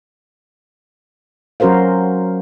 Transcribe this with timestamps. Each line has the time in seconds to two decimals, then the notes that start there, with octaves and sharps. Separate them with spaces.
1.60 F#3 C#4 F#4 A#4 C5 F5